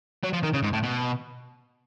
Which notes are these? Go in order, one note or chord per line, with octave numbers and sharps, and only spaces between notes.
F#3
F3
D#3
C#3
G#2
A2
B2